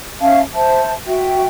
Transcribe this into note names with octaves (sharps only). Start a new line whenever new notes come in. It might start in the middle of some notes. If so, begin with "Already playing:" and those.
C#4 E5 F5 A5
C5 E5 A5
F#4 E5 G5